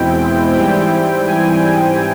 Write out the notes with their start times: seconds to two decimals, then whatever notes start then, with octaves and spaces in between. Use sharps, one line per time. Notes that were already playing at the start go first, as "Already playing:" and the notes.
Already playing: E2 B2 G#3 C4 E4 G5
0.52 G#2 E3 G3 C4 E4 G5
1.26 G#5